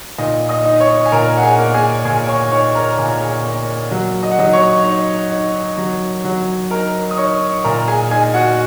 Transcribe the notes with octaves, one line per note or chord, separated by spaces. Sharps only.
A#2 D#4 D#5
D#5 D#6
D#4
C#5 C#6
G#5
A#2 A#4 A#5
F#5
G#4 G#5
A#3
G#4 G#5
A#2 G#4 G#5
C#5 C#6
D#4 C#5 C#6
A#4 A#5
A#2 G#5
A#5
G#4 G#5
A#3
F#3
D#5
F#5
F#3 D#4 D#5
C#5 C#6
D#4
D#4
F#3
F#3
D#4 A#4 A#5
D#6
D#4 C#5 C#6
A#2 A#4 A#5
G#4 G#5
D#4 G#4 G#5
F#4 F#5